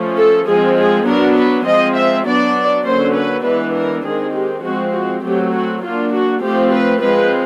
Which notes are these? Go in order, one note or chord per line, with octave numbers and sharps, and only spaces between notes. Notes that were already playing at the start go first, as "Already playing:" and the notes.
Already playing: F3 A3 C#4
A4
F3 G#3 C4 G#4
G#4
F#3 B3 D4 A#4
B4
F3 G#3 C4 D#5
E5
F#3 B3 D4 D5
D3 F#3 A#3 C#4 C5
B4
E3 G#3 B3 D4 B4
A#4
D#3 G#3 C4 G#4
G4
F3 G#3 C4 F#4
F#4
F#3 A3 C4 G4
F#4
F#3 A#3 D4 F4
F#4
F3 A3 C4 G4
B4
F3 G#3 C4 B4